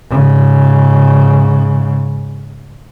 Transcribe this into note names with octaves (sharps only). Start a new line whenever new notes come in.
G#2 C#3